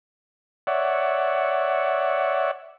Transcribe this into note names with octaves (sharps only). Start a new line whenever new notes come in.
C#5 D5 E5 F#5